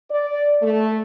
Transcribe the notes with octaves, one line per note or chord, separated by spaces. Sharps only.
D5
A3